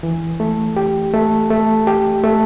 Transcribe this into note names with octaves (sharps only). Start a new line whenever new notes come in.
E3
A3
G4
A3
A3
G4
A3